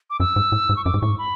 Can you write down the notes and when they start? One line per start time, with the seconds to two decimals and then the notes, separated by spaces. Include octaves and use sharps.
0.10 D6
0.20 F#2 E6
0.36 G#2
0.52 A2
0.69 G#2
0.77 C#6
0.85 F#2 D6
0.94 G#2
1.01 A2 C#6
1.10 G#2
1.18 B5